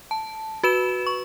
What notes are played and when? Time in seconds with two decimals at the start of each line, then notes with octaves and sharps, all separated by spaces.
0.11 A5
0.63 F#4 B4 E7
1.07 C#6